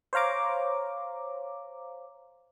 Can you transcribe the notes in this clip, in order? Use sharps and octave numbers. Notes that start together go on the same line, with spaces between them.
C5 C#5 F5 A#5 D6